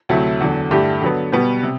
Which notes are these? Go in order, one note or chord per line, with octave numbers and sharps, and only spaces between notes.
D2 C3 F#3 A3 E4
E2 D3 F#3
G2 D3 A3 E4 G4
D3 F#3 B3
B2 G3 B3
C3